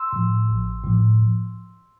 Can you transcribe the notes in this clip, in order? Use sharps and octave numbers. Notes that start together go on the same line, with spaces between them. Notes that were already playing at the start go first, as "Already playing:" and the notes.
Already playing: C6 E6
A2 F3
A1
A2 F3